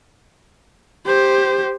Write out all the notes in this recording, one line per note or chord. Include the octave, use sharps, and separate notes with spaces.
G4 C5